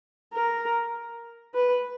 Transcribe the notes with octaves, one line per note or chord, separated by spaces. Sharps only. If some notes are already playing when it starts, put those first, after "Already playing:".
A#4
B4